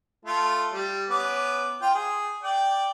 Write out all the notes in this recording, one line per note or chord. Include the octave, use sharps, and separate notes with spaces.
A3 F4 A4
G3
B3 C#4 D6
F4 G5
G#4
D5 G5